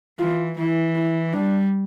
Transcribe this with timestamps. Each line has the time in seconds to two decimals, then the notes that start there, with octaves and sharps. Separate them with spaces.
0.19 E3 F4
0.57 E3 E4
0.95 E4
1.33 G3 D4